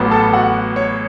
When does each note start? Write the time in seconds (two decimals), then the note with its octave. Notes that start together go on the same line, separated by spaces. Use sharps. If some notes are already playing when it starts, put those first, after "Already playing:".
Already playing: A1 A2 F#3 B3
0.11 A4 A5
0.33 F#4 F#5
0.76 C#5